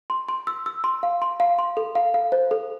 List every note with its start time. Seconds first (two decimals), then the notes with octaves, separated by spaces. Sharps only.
0.10 C6
0.29 C6
0.47 E6
0.66 E6
0.84 C6
1.03 F5
1.22 C6
1.40 F5
1.59 C6
1.77 A4
1.95 F5
2.14 F5
2.32 C5
2.51 A4